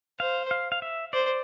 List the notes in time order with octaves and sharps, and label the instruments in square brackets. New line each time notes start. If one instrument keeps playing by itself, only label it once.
[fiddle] C5 [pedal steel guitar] F5
[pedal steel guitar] F5
F5
E5
[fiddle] C5 [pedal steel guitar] D5